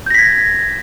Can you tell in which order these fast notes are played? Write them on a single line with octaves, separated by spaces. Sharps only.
G6 A#6 B6 G#6